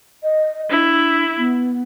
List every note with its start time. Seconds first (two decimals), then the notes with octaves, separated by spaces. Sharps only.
0.23 D#5
0.70 D4 E4
1.38 B3